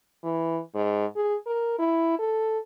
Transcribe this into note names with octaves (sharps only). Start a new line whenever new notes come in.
E3
G#2
G#4
A#4
E4
A4